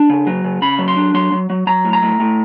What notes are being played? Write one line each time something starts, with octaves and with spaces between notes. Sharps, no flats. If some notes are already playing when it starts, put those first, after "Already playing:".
Already playing: D4
C#3
F#3
C#3
C#3 B5
F#3
C6
D4
F#3 C6
F#3
F#3
F#3 A#5
A2
A#5
A2
A2